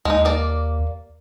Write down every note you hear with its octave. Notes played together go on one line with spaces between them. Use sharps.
D#2 G#3 D#4
A#3 D5